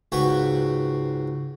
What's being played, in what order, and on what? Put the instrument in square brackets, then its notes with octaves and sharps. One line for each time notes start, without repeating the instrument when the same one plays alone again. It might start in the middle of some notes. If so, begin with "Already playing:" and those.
[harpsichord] C#2 G#2 F#4 B4 G5 C#6